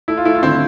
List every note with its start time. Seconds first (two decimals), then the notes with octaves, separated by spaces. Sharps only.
0.08 A3 E4
0.17 F4
0.25 A3 E4
0.35 F4
0.43 D3 C4 E4